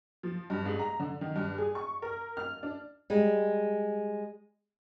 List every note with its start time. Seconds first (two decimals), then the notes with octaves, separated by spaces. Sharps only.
0.23 F3
0.50 G2
0.65 G#2
0.79 A#5
1.00 D3
1.21 D#3
1.36 G2
1.58 G#4
1.75 C#6
2.02 A#4
2.37 F6
2.63 D4
3.10 G3 G#3